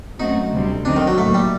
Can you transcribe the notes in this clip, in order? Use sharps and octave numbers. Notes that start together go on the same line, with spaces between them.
F#2 F#3 A3 C4 D#4 F#4
D2 C3 G3 C4
D3 F#3 C4 D4 D#4
D#3
F#3
A2 F#3 A3 A#3
G3